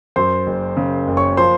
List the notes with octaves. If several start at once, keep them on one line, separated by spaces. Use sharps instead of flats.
F#2 C5 C6
F#1
C#3
F#1
C#5 C#6
F3 C5 C6